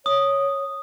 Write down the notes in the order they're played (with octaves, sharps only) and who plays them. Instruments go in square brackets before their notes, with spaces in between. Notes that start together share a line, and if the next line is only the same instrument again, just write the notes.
[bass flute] C#5 [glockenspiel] D#6